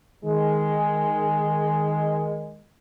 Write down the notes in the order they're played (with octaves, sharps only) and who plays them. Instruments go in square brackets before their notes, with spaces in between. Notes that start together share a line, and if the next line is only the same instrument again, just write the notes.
[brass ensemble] D#3 G#3